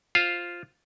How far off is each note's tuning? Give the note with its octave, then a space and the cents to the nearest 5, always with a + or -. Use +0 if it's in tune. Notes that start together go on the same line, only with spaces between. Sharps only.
F4 +0 C5 +5 F5 +0